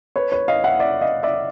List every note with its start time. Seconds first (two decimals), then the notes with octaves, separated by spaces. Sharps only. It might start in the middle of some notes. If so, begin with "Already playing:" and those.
0.16 B4 C#5
0.32 B4 C#5
0.48 D#5 F5
0.64 E5 F#5
0.80 D5 E5
1.01 D#5 F5
1.23 D5 E5